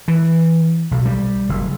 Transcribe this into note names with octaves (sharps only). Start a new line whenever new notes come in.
E3
B1
G3
F#1